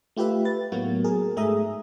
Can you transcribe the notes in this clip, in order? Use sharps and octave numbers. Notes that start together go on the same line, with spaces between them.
A3 F4 G4 B4 E5
B4 A6
A2 F#3 A#3 B3 F#4
G#4 A#4
G#2 A3 G#4 E5 A#5 D#6